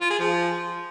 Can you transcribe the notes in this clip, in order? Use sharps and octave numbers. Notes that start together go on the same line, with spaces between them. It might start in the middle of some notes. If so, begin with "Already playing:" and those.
F4
G#4
F3